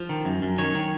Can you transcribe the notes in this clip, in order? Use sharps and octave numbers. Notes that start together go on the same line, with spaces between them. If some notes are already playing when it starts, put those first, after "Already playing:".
Already playing: F3
D#3
F#2
F#2
D#3 C#5
D#3